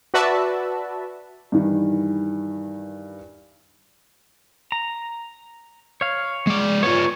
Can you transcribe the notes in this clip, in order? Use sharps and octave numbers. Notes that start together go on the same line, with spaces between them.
F#4 B4 D5 E5 A5
G2 D#3 E3
A#5
C#5 F5
G#3 D5
B3 F4 C#5